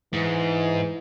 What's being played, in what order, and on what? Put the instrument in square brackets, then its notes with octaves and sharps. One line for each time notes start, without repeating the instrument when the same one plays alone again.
[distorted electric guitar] G#2 [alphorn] E3